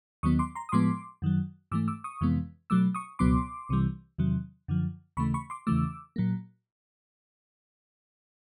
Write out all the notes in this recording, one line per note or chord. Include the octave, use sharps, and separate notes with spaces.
D#2 D#3 F#3 B3 C#6 D#6
C6 D6
A#5 C6
D#6
A2 F3 G#3 B3 C6 D6
F#2 D#3 F#3
G#2 E3 A3 D6 E6
D6 E6
C#6 D#6
F2 C3 E3 G#3 B3
B2 F#3 A3 D6 E6
C#6 D#6
C#2 B2 F#3 B3 C6 D6
C2 C3 E3 G3
E2 C3 D#3 F#3
F#2 D3 F3
D#2 C#3 E3 A3 B5 C#6
B5 C#6
C6 D6
E2 C#3 E3 A3 D6 E6
A#2 F#3 A#3